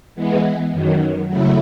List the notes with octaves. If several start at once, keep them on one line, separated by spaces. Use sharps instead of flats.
E3 G#3 B3
F#2 D#3 F#3
C#3 F#3 A3 E4